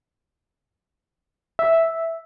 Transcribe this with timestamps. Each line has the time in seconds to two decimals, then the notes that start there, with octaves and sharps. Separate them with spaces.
1.59 E5